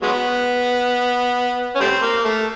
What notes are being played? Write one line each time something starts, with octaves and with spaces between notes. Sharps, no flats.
F#3 G#3 B3
C#4
G3 A3 C4
A#3
A3